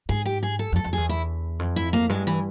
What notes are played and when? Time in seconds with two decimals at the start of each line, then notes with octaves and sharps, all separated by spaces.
0.09 G#2 G#4
0.25 G4
0.43 G#4
0.59 A4
0.72 F2
0.76 A4
0.84 F2
0.93 E2 G#4
1.09 E4
1.59 F2
1.76 E4
1.93 A#3
2.09 G2 G#3
2.27 E3